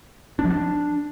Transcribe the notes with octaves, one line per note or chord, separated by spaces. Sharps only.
D4
F3
D4